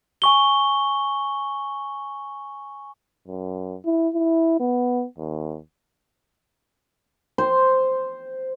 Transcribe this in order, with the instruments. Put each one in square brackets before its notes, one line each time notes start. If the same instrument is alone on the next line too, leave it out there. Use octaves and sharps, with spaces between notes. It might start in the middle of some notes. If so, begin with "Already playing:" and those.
[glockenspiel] G#5 C#6 G7
[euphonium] F#2
E4
E4
B3
D#2
[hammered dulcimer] C5